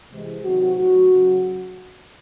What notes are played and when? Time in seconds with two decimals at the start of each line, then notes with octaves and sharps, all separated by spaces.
0.10 C3 E3 G#3
0.43 C3 D#3 F#3 F#4
0.77 A2 F#3
1.11 C#3 F#3